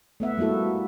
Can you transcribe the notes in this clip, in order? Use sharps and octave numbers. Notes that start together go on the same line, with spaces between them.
A3 B3 E5 F#5
G3 A#3 E4 F#4 A4